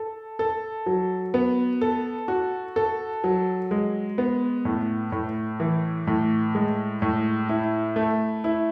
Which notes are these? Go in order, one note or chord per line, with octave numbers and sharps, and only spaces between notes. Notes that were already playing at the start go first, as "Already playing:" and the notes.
Already playing: A4
A4
F#3
B3
A4
F#4
A4
F#3
G#3
B3
A2
A2
E3
A2
G#3
A2
E4
A3
E4